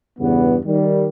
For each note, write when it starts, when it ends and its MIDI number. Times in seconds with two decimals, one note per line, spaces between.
0.19 0.56 40
0.19 0.56 43
0.19 0.56 49
0.19 0.56 59
0.66 1.07 51
0.66 1.07 55